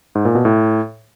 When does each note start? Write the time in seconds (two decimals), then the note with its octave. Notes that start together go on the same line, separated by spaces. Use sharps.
0.15 G#2
0.25 A#2
0.35 B2
0.45 A2